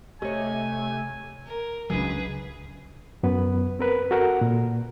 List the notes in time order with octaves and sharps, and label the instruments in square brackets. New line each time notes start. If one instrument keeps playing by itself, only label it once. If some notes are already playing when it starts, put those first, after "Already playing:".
[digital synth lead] C3 [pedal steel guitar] A3 [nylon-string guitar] C#5 D#5 [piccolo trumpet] G#5
[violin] A#4
[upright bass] C#2 D4 [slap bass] F#3 [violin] G#4 B4
[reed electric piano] F#2 B3 B4
C4 A#4 B4
F#4 A4 A#4 F#5
A#2